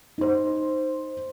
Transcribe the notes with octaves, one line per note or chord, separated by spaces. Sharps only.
D#4 C5